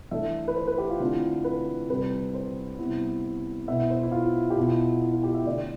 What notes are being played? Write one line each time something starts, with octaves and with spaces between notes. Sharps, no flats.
E3 A3 D4 E5
B4
C5
B4
G4
F4
D3 A3 C4 E4
B4
C3 G3 C4 E4 B4
C5
C3 G3 B3 E4
B2 B3 E4 E5
C5
E4
F4
G4
B2 B3 E4 F4
E4
F4
G4
E5
D3 A3 E4 D5